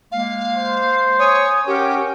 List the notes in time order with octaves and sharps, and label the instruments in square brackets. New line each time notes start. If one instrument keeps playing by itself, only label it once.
[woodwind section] G#3 A#3 [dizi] F5
[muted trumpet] C5
[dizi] C#5 [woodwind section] G#5 C#6 D#6
[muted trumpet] C#4 [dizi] G4 [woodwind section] A#4 F#5 G5